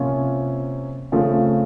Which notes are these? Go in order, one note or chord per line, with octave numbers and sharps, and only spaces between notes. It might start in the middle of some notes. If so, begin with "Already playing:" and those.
Already playing: C3 F3 A#3 C#4 F4
C#3 F3 A3 C4